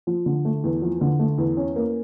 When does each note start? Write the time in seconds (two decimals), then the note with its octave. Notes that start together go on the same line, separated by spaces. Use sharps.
0.07 F3
0.26 D3
0.45 A3
0.64 E2
0.82 F3
1.01 D3
1.19 A3
1.38 E2
1.57 C#4
1.76 A#3